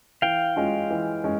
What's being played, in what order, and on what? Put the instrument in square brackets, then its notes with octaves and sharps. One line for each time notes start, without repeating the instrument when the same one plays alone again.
[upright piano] E3 [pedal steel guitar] F5 G5
[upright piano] G#3 C#4 F4
E3
G#3 C#4